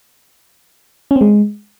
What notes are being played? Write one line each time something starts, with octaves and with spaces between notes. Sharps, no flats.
C#4
C4
G#3